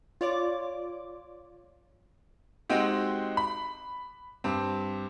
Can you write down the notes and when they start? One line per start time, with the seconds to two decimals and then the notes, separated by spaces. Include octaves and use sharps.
0.21 F4 C#5 D5 D6
2.70 G#3 C4 D#4 F#4 G4
3.37 B5
4.44 G2 C4